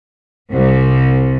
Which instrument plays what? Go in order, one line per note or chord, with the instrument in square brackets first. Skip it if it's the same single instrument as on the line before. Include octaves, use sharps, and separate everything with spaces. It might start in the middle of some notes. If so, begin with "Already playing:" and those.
[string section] C2